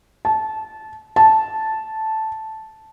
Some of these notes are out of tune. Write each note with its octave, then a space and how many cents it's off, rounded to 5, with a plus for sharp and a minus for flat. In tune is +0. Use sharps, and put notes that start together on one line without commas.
A5 -20
A5 -5